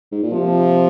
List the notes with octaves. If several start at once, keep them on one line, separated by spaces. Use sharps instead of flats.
G#2
A#2
C3 F3